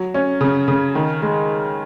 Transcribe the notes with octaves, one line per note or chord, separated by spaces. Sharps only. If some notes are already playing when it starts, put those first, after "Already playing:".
Already playing: F#3
C#4
C#3
C#3
D#3
G#3